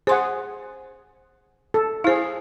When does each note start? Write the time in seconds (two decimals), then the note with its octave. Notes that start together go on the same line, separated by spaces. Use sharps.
0.07 G#4 C5 F#5 C6
1.74 A4
2.04 E4 G#4 C5 F5